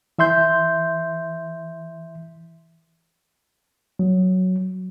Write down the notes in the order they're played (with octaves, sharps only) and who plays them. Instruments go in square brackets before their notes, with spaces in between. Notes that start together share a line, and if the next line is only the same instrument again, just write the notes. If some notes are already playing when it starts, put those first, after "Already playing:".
[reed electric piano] E3 E5 C6 G6
[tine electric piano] F#3